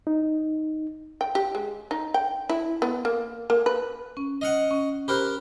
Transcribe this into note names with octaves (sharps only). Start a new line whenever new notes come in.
D#4
G5
G4
G#3
D#4
G5
E4
B3
A#3
A#3
B4
C#4
D#5 F5 F#5
C#4
G4 A#4 C5 B5 F6 F#6